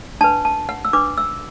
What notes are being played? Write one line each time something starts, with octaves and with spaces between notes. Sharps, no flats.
D4 B4 A5
A5
F#5
E6
D4 B4 D6
E6